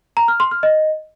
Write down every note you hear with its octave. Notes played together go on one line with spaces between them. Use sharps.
A#5
F6
C6
F6
D#5